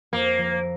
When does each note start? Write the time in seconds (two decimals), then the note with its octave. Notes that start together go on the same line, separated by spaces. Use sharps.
0.13 F2 A#3
0.38 F3